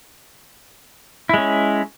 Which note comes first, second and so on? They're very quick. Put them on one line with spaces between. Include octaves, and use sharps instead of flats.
E4 G#3 C#4